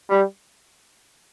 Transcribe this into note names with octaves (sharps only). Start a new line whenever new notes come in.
G3